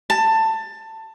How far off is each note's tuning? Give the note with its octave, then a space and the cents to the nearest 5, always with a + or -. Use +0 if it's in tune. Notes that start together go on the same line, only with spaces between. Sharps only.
A5 +15